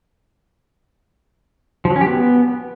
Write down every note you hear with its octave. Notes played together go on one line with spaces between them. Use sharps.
F3
F#3
C#4
G4
B3